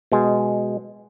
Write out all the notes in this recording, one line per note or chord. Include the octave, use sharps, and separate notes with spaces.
B2 G#3